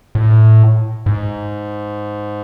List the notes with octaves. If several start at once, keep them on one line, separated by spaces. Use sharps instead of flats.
A2
G#2